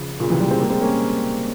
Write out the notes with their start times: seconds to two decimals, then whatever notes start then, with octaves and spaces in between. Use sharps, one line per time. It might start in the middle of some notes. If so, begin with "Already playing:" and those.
Already playing: C#3 F3
0.20 A#2 C#3
0.30 C3 E3
0.40 E3 G3
0.51 G#3 C4
0.61 G3 A#3
0.70 G#3 C4
0.81 A#3 C#4